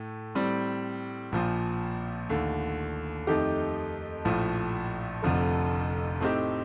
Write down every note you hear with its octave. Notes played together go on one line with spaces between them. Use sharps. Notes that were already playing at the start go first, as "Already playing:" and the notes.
Already playing: A2 A3
A2 G3 C4
A#1 A#2 F3
D#2 D3 A3
F2 D#3 A3 D#4 G4
A#1 A2 F3
F1 F2 D3 F3 A3
A2 A3 C4 D#4 G4